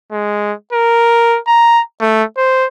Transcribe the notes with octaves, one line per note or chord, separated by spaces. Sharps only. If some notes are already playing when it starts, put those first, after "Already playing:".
G#3
A#4
A#5
A3
C5